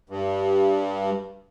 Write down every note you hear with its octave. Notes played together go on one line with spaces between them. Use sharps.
G2